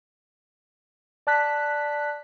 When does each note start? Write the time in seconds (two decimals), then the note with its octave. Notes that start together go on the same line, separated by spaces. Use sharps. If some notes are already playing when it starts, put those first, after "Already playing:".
1.27 D5 A5 F#6 B6